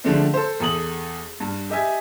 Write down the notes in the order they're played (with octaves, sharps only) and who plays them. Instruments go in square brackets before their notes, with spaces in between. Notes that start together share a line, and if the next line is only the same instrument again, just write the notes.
[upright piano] D3 F3 G#3 A3 C4 D4
A4 C5
E2 A4 D#6 F#7
G2
G4 D#5 E5 G#5